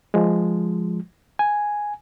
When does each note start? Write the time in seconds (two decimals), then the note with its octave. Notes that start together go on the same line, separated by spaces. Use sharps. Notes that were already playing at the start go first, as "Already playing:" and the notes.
0.14 F3 G#3
1.39 G#5